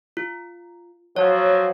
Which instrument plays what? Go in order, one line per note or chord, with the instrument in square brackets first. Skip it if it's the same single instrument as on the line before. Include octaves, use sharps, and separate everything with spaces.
[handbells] F4
[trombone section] F3 F#3 [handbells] C#5